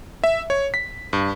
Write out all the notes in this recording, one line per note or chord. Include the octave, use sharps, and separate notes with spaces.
E5
C#5
B6
G2